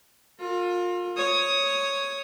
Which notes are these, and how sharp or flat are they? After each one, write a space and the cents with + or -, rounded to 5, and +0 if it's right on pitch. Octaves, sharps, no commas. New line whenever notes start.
F4 +25 A#4 -35
C#5 +0 D#6 +10